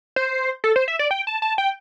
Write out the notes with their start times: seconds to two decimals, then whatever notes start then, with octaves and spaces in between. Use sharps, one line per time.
0.16 C5
0.64 A4
0.76 C5
0.88 E5
0.99 D5
1.11 G5
1.27 A5
1.42 A5
1.58 G5